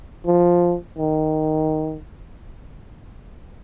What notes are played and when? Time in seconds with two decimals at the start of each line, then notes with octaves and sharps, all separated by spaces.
0.26 F3
0.98 D#3